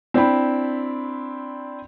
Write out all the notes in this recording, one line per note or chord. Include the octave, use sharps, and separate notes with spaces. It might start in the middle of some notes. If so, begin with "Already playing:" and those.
C4 D4 E4 G5 B5